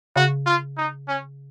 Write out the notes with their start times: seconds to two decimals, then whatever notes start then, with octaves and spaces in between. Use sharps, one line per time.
0.16 C#3 F#4
0.46 F4
0.77 D#4
1.08 C#4